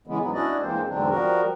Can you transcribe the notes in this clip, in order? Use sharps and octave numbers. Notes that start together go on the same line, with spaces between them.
C#3 E3 G#3 B3
G#2 F#3 B3
C#4 D4 E4 F#4 D5 D#5
G2 E3 G#3 A#3 C4 C5
E2 G#2 D3 F#3 C4 D4
F3 G3 F#4 A#4